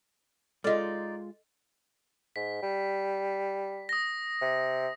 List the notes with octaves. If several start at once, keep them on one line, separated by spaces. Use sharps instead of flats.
G#3 D#4 F4 A4 D5 D#5
G#2 B6
G3
D#6 A#6
C3